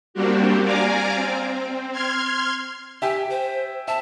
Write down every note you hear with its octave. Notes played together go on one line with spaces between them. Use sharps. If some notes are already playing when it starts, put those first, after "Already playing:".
G3 A#3 C4 D4 F#4 G4
D5 F5 G#5 A#5 D6
C4
C6 F6 G#6
G4 E5 G5 G#5
C5
E5 A5